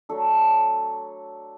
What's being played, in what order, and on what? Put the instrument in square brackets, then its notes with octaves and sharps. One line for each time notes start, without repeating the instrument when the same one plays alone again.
[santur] F#3 A3 D4 A4